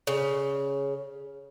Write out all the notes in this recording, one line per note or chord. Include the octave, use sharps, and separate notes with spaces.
C#3